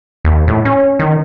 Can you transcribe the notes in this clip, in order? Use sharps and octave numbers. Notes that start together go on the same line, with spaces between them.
D#2
A2
C#4
D#3